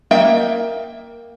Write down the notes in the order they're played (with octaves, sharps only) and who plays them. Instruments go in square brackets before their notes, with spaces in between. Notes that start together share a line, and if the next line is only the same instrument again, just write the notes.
[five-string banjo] A#3 D#5 E5 G5